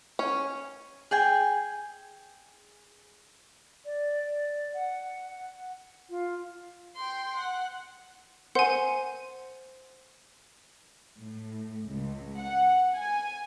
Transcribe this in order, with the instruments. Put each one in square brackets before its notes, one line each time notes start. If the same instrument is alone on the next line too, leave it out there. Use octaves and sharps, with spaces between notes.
[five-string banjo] C#4
[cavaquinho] G#4 G5 G#5
[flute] D5
F#5
F4
[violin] G5 C6
F#5
[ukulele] C5 [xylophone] F#5 G#5
[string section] A2
C#2
F#5
G#5